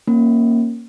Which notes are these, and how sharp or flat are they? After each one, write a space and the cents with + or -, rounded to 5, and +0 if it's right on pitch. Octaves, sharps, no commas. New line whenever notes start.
A#3 +0 C#4 -20